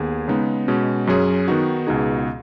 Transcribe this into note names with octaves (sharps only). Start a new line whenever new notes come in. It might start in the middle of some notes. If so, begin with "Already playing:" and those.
Already playing: D#2 B3 G#4
C#3 G#3 B3 D#4
B2 G#3 C#4
F#2 F#3 C#4 G#4
D#3 B3 D#4 F#4
C#2 B2 B3 D#4 G#4